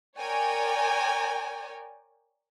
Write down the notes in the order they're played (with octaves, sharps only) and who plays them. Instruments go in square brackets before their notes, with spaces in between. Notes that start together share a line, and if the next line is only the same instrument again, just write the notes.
[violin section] A#4 C#5 D5 G5 G#5